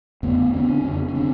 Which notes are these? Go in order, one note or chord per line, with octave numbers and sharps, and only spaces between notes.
F2 D3 A3 B3
D#2 D3 B3 C#4
C4 D4
F2 C#3
C#4
D3 C4 D4